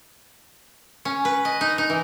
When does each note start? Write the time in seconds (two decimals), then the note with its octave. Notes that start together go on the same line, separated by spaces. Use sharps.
1.05 C#4
1.25 B4
1.45 D#5
1.61 D#4
1.78 D#4
1.90 E3